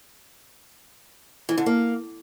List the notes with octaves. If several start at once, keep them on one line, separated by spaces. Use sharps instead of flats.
E3
D3
A#3